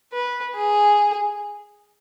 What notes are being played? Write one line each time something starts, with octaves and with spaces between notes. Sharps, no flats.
B4
G#4